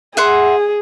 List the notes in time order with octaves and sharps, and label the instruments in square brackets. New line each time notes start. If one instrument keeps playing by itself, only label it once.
[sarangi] G#4 [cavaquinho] E5 F#5 C6